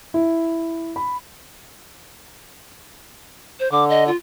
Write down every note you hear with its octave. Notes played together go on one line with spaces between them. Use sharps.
E4
B5
C5
D3 D6
D#5
F4